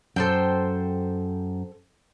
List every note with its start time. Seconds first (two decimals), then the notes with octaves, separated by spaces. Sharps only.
0.16 F#2 A4 C5 G5